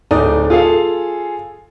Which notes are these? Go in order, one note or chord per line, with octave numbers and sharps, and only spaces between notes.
D1 A3 D#4 D5 D#6
F4 G#4 A4 F5